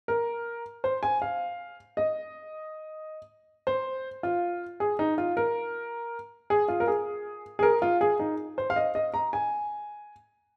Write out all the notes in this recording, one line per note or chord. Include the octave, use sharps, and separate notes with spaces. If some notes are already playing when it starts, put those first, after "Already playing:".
A#4
C5
G#5
F5
D#5
C5
F4
G#4
D#4
F4
A#4
G#4
F4
A#4
G#4
G#4
A#4
F4
G#4
D#4
C5
F5
D#5
D#5
A#5
G#5